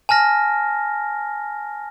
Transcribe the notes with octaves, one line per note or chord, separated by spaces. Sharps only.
G#5 A5 F6 A#6